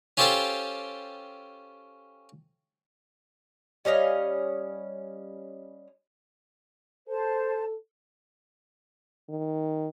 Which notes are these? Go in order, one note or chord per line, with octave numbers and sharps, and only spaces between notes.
C#4 F4 G4 A4 C5 G5
G3 C#4 D#5 F5
A4 C5 A5
D#3